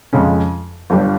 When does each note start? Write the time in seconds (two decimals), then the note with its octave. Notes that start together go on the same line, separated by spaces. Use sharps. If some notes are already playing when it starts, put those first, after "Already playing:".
0.13 F2 C#3 G#3 C#4
0.90 G1 G2 G3